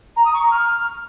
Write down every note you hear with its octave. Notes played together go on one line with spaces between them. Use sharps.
A#5
D#6
C#6
A#5
F6